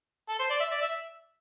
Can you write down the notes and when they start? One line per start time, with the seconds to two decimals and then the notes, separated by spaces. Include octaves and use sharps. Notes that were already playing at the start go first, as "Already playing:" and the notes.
0.29 A4
0.39 C5
0.50 D5
0.60 E5
0.71 D5
0.82 E5